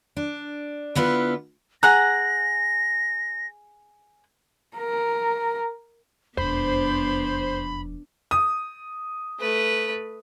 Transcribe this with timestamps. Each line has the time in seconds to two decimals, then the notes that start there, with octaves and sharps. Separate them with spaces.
0.17 D4
0.95 D3 B3 E4 F4 B4
1.83 G#4 F#5 A#5 F#6 A#6
4.77 A#4
6.37 E1 F2 B3 D4 C5 B5
8.31 D#6
9.40 A3 B4